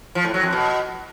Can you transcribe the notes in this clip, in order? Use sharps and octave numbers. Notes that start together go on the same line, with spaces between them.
F3
A2
F#3
F2
B2